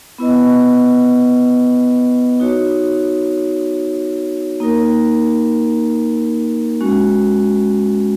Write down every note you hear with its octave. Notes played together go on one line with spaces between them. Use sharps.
B3 E4 B4 D#5
D#4 F#4 C#5
A#3 D#4 A#4
G#3 C#4 F#4